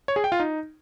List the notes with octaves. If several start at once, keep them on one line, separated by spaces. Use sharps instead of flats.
C#5
G#4
G5
F4
D#4